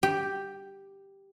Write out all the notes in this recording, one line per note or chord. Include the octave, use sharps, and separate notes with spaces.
G4